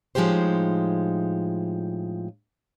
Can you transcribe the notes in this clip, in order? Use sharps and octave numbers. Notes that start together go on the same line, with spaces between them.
A2 F3 G#3 D#4 G4 C5